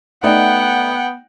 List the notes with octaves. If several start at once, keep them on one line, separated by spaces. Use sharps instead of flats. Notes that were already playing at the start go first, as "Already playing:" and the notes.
A3 B3 D#4 D5 F#5 G5